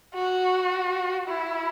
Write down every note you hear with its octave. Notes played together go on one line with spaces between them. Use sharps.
F#4
E4